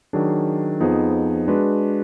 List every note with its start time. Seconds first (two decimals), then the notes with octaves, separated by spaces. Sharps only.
0.13 D#3 F#3 D4 G#4
0.80 F2 F3 B3 D#4 G#4
1.48 G#3 D4 F#4 B4